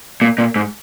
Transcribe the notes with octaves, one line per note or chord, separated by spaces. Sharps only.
A#2
A#2
G#2